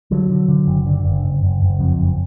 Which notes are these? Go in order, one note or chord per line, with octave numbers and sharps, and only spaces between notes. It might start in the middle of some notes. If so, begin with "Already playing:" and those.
D3 F#3
D3
D3
F#1
D3
F#1
F#1
F#1
F#1
F2
F#1